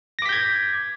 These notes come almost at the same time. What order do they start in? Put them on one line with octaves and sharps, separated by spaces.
A#6 D6 B6 G6 G#6